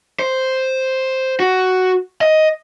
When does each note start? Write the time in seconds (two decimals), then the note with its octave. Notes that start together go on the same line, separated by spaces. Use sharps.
0.19 C5
1.40 F#4
2.21 D#5